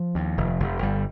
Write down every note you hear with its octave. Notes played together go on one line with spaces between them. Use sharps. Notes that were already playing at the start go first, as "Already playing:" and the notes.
Already playing: F3
D#2
F1
F1
G1 G3